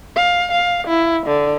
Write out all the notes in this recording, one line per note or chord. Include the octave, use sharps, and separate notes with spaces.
F5
F5
E4
D3